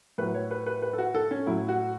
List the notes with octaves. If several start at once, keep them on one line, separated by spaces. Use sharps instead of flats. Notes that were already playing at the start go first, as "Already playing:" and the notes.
A2 F#3 B4
C#5
B4
B4
B4
A4
F#4
A4
C#4
A2 F#3 E4
F#4